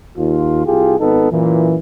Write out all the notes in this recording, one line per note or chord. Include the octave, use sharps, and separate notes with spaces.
D#2 F4
C2 F4 G4 G#4
G#1 B3 D#4 A4
F#2 A#2 E3